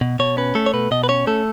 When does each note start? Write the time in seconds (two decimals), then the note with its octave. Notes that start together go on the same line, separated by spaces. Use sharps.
0.01 B2
0.19 B2 C#5
0.37 C#4 B4
0.55 A3 A4
0.66 C#5
0.74 B2 B4
0.91 B2 D#5
1.04 B4
1.09 C#4 C#5
1.27 A3 A4